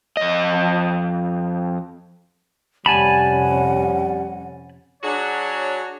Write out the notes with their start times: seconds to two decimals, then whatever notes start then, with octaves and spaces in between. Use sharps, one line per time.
0.17 F2 D#5
2.86 F2 C3 G3 C#4 F#5 G#5 A5 B5
5.02 F#3 D4 F#4 G#4 C#5